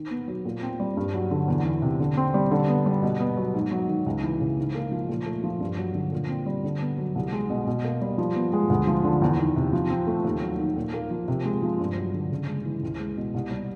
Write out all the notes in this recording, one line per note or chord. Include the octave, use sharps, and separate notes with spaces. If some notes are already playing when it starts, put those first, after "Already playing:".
Already playing: D#3
B3
F#3
A#2
C4
G3
G2
F#3
D3
E2
E3
C3
D3
C4
G3
D3
B3
G3
B2
B3
F#3
G#2
F#3
D#3
C#2
E3
C#3
G#2
A#3
F3
A#2
A3
F3
G2
F#3
D3
A#2
C4
G3
D3
B3
F#3
C2
G#3
B2
B2
A#3
G3
F3
B3
G#3
D2
F3
D3
E2
D#3
C3
F3
C4
A3
D#2
F#3
D#3
A#2
A#3
F3
C3
G#3
F3
G2
F#3
D3
C#3
G#3
E3
C#2
G#3
B2
C2
G3